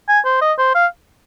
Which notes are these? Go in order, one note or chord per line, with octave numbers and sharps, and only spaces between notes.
G#5
C5
D#5
C5
F5